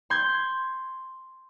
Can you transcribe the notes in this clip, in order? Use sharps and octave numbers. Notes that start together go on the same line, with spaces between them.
C6 G6 G#6